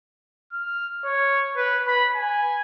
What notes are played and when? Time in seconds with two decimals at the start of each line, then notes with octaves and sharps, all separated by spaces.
0.52 F6
1.05 C#5
1.56 B4
1.88 B5
2.16 G#5